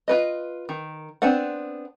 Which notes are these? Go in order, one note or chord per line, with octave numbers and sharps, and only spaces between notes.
F4 B4 D#5
D#3
B3 C4 D4 B4 F#5